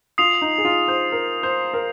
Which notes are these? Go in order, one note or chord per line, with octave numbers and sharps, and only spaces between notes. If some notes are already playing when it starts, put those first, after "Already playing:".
F4 D#6 C7 F7
D#4
G#4
F4
C5
A#4
C5
A#4